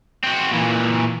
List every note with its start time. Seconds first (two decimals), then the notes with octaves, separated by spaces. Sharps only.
0.23 C4 F#4
0.52 A#2 E3